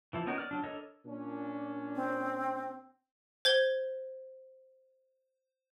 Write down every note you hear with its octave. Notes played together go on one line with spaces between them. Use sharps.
E3 F3 E4
B3 C#4 D#4 F#4 A#4
D5 F6
F#3 D4
D4 A4 A#4 C#5 D#5
A#2 C#4 D4
C4
C5 G#6 G7